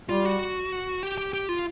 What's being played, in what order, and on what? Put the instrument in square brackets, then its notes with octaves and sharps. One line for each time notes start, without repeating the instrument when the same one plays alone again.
[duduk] G3 [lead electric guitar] F4
[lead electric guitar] F#4
G4
G4
G4
F4